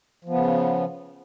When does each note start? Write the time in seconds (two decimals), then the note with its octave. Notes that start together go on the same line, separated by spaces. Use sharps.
0.25 F3
0.29 B3
0.34 C#3